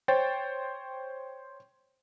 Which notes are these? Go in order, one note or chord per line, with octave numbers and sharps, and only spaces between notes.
C5 C#5 G5 A6